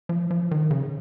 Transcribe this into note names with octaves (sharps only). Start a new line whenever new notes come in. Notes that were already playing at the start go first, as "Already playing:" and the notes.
F3
F3
D#3
C#3